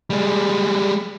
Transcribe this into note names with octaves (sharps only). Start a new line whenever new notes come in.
G3 G#3